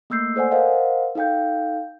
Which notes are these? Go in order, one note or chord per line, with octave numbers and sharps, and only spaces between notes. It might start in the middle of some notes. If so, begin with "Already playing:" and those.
A3 A#3 E6 G6 C7
A4 C5 D5 F#5 G#5
A#4 C5 D#5 F5 F#5
D#4 A4 F5 G5 G6